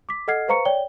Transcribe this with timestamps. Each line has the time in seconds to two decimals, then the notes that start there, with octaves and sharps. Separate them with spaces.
0.09 D6 B6
0.28 A4 D#5 F#5 F6 G#6 C7
0.48 B4 C5 F5 A#5 C#6 C#7
0.65 C#5 D5 G5 G7